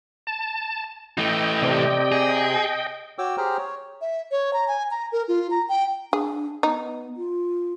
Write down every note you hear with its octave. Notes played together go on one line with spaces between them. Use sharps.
A5
E3 A3 D#5 G5
C3 D5
G#4
F#4 C#5 G5 D6 E6
G4 G#4 C5 G5 A#5 F6
C#5
E5
C#5
A#5
G#5
A#5
A#4
F4
A#5
G5
D4 G#4
B3 D#4
F4